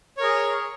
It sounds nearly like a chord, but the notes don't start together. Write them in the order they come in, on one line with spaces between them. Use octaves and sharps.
C#5 A#4 G#4